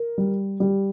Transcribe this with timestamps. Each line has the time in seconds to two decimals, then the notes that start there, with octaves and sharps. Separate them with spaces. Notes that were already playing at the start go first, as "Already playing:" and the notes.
Already playing: A#4
0.18 G3
0.60 G3